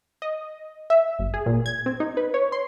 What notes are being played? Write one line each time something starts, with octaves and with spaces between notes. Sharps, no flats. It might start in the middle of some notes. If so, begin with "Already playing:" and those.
D#5
E5
G1
G#4
A#2
G#6
C4
D#4
B4
C#5
C6